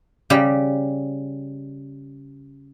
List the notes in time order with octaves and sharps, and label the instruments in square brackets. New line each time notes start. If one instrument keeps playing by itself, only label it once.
[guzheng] C#3 G3 G4